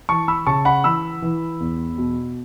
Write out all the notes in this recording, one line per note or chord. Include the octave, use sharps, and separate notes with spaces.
E3 A5 C#6
B5 E6
C#3 A5 C#6
F#5 B5
E3 B5 E6
E3
E2
B2